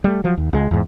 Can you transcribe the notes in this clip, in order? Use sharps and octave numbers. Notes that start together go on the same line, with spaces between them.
G3 A3
F3 F#3
D#2
C#2 G#3
E2 G#2